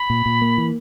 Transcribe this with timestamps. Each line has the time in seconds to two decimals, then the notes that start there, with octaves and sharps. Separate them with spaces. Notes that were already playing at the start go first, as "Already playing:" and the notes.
Already playing: B5
0.10 A#2
0.26 A#2
0.42 A#3
0.58 E3